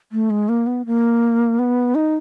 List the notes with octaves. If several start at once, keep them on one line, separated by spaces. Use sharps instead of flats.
A3
G#3
A#3
B3
A#3
B3
D#4